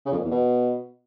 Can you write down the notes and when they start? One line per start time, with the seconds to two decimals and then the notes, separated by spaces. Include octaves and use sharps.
0.06 C#3
0.12 F2
0.18 A#2
0.25 E2
0.31 B2